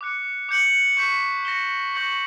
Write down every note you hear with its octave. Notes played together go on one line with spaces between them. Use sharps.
D6 F#6 C#7
D6 G6 C#7 F#7
C#6 G6 B6 E7
A#6 C#7 E7 G7
C#6 G6 A#6 C#7 F#7